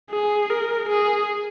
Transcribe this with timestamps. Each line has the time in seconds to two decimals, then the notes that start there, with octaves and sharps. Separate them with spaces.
0.11 G#4
0.50 A#4
0.89 G#4